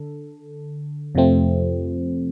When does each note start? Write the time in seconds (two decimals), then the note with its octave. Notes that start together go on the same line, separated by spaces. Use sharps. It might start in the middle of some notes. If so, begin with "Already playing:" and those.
Already playing: D3 A4
1.15 F2 C3 F3 A3 C4